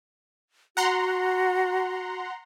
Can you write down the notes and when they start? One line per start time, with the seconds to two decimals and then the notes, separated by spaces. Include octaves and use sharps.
0.77 F#4 F#5 A#5 C6